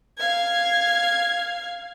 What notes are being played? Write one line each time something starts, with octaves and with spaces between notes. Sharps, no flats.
F5 G#6